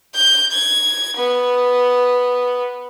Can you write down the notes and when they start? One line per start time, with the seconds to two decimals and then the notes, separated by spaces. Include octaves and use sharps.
0.15 G6
0.52 G#6
1.17 B3